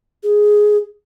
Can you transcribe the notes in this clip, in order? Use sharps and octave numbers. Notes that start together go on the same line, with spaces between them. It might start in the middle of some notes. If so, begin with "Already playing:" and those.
G#4